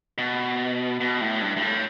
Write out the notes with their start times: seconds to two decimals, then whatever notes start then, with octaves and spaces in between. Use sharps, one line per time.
0.18 B2
1.01 B2
1.21 A2
1.42 G2
1.57 G2
1.62 A2